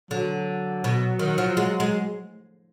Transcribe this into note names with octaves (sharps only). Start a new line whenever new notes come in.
D3 F#3
B2
D#3
F3
G#3
G#3